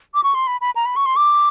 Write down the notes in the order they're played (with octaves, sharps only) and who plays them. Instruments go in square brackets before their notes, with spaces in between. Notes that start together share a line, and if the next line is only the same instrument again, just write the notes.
[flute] D6
C#6
C6
B5
B5
A#5
B5
C#6
C6
D6